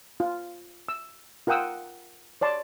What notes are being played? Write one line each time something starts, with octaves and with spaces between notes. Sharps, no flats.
F4
E6
F4 A#4 F#5 G5 D#6 E6
C#5 D5 A5 C6